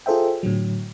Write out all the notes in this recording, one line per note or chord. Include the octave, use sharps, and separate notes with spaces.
F4 G#4 A4 C5 E5 G5
A2 D3 F#3